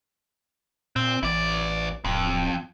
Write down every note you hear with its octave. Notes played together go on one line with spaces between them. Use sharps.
A#2 C4
A1 E4 D5
D1 F2